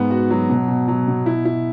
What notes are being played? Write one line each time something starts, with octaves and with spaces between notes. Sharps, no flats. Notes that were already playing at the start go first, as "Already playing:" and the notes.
Already playing: G#2 B3
F#4
F#3
B2
B2
F#3
B2
E4
E4